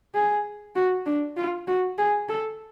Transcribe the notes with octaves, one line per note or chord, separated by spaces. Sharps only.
G#4
F#4
D4
F4
F#4
G#4
A4